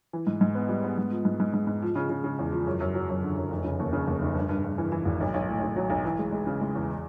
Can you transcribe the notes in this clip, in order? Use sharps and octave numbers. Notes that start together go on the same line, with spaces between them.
E3
G#2
G#2
B3
G3
B3
G#2
F3
G#2
G#2
G#2
G#2
F3
C#3
C#3
C#3
E2
F3
F#2
F#2
F#3
F#2
D3
F#2
F1
C#3
D#2
C#3
D#2
F1
G2
G2
G2
E3
E3
G#1
B1
B1
A2
B1
F#3
B1
E3
G#3
G#3
C#3
G#3
E2